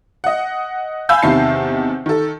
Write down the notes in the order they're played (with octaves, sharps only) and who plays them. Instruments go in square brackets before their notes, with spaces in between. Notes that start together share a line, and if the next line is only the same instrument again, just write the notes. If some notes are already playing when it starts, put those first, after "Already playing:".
[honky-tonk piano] D#5 F#5
F5 G#5 B5 E6 G6
E2 C3 D#3 E5 A5 C7
D#3 A4